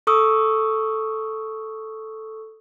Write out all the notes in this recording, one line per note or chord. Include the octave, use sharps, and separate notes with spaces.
A4 C#6 D#6 E6